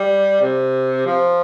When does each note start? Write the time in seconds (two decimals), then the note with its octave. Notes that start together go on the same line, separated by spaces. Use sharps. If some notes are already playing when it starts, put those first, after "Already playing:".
Already playing: G3
0.42 C3
1.07 F3